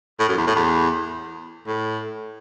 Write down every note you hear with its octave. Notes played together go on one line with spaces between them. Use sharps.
A2
F#2
E2
A2
E2
A2